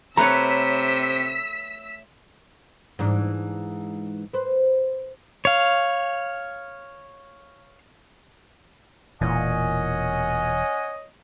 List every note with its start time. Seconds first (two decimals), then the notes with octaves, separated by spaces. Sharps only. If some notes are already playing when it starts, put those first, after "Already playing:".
0.17 C3 A3 B4 C#5 A#5 E6 B6
2.99 G#2 E3 D4
4.33 B4 C5
5.45 C#5 F5
9.21 E1 A#2 E3 C#4 C#5 D#5 F#5 G#5